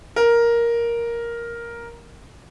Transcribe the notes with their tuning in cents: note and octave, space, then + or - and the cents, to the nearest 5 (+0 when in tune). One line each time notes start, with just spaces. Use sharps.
A#4 +5